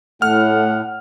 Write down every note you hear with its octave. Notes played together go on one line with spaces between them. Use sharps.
A2 A3 F#5 F6